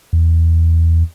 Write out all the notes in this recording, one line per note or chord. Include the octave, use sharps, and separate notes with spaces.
E2